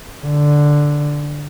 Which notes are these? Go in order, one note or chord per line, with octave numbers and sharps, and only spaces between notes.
D3